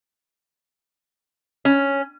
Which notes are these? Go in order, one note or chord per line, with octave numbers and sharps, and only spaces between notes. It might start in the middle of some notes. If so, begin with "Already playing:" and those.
C#4